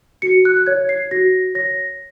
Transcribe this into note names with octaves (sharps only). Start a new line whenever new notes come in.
F#4 C#7
F#6
F#6
C#5 G#6
C7
F#4 A#6
C#5 A#6